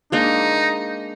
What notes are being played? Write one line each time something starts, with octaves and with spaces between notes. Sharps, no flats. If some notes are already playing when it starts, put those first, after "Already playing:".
G#3 A#3 D4 D#4